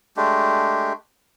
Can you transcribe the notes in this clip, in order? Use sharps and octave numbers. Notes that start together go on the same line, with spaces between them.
G#3 A3 D4 G4